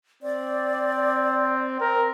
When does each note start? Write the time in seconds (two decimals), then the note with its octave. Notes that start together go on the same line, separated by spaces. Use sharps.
0.23 C4 D5
1.81 A#4